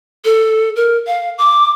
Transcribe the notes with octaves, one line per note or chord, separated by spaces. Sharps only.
A4
A#4
F5
D6